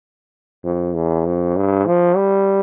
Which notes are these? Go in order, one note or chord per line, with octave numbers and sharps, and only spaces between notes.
F2
E2
F2
G2
F3
G3